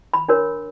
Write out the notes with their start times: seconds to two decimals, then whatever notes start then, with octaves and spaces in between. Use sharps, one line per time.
0.14 B5
0.28 D4 F#4 A#4 C#5